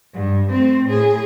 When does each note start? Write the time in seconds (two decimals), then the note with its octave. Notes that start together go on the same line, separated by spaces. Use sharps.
0.15 G2
0.52 A3 C4
0.86 A2 G#4